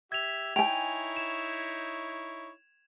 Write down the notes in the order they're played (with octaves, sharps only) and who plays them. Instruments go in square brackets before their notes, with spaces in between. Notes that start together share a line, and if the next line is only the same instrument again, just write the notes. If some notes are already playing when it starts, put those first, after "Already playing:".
[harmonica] G4 E5 [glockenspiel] G#6 F7
[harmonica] D#4 E4 C#5 [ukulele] G5 G#5 [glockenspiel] F7
[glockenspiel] E7